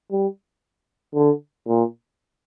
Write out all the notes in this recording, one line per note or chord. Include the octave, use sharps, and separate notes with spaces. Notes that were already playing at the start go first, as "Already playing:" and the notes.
G3
D3
A#2